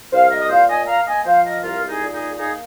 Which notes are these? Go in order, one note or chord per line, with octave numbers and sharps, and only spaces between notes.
C2 C5 F5
A#4 D#5
D#5
A#2 C5 F5
D#5 G#5
A#3 F5 A#5
D#5 G#5
F3 C5 F5
A#4 D#5
C2 F4 A#4
D#4 G#4
A#2
D#4 G#4
A#3 D#4 G#4